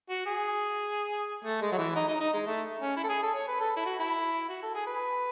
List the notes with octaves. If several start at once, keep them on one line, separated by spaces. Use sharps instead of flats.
F#4
G#4
A3
G#3
F#3
E3
D#4
D#4
D#4
G#3
A3
C#4
E4
A4
G#4
A4
C#5
B4
A4
E4
F#4
E4
F#4
A4
G#4
B4